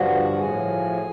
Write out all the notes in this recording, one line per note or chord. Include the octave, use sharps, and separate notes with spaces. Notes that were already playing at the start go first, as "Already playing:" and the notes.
Already playing: G2 D3 F3 F#4
A2 F3 G#4